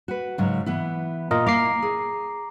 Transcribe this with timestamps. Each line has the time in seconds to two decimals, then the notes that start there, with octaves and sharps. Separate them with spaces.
0.08 F#4 B4
0.38 G#2 C#3 F#3
0.66 E3 B3 E4
1.31 A#2 F4 A#4 D#5
1.46 A#3 E4 F5 A#5 D6 C7
1.82 G#4